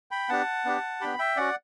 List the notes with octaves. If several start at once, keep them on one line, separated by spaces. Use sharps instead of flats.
G5 B5
B3 D4 G4 F#5 A5
B3 D4 G4
B3 D4 G4 G5 B5
E5 G5
C#4 F#4 D5 F#5